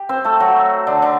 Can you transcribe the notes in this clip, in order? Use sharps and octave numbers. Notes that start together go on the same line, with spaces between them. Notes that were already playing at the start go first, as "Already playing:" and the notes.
Already playing: G4
C4 C5
A3 A4
F#3 F#4
D3 D4
D3 D4